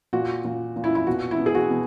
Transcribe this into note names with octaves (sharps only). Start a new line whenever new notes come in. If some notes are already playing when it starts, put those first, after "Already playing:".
A#2 F#4
A#2
A#2
E4
E4
B2 F#4
E4
B2
G#4
F#4
B2